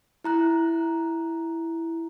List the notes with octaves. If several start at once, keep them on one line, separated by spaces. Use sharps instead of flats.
E4 A#5 F#6